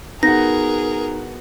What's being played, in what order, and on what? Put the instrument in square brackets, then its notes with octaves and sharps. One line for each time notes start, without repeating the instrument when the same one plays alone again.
[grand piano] B3 F#4 [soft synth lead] D#4 [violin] G#4 A#4 [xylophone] A#6